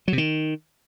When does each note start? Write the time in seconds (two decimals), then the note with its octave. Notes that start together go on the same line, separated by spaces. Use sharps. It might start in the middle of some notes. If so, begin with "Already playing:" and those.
0.08 F#3
0.13 C3
0.18 D#3